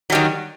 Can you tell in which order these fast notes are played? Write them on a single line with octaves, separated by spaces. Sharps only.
F#3 G3 D#3